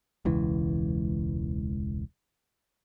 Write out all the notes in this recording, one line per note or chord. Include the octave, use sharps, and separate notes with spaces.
E1 C#2 E3